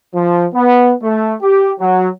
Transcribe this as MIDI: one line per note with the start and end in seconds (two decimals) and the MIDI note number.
0.14 0.46 53
0.55 0.93 59
1.03 1.35 57
1.42 1.72 67
1.80 2.08 54